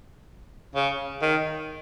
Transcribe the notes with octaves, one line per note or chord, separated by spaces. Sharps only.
C#3
D#3